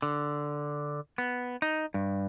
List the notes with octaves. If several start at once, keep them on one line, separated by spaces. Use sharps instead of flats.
D3
B3
D#4
G2